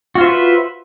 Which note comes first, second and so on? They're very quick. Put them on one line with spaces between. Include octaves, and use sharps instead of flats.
F#4 F4 C5 E5 B4